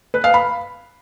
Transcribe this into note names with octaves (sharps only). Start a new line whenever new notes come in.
B4
F5
B5